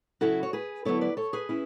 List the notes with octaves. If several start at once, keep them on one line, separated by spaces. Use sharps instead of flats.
C#3 F#3 C#4 E4 F#4 A4
C#5
G#4 B4
D3 F#3 B3 E4 A4 C#5
B4 D5
A4 C#5
G#4 B4
C#4 E4